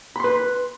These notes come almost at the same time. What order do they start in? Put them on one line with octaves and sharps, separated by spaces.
B5 C6 B4